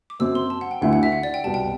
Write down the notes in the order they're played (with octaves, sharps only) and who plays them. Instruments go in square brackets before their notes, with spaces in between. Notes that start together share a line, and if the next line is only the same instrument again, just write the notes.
[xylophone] D6
[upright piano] F#2 F#3 C4 [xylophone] E6
[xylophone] C6
A5
F#5
G5
[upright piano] D2 D3 A3 E4 [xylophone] F#5
[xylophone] F#5
E5
F#5
D5
G5
[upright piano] C2 B2 G3 [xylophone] A5
[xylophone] G5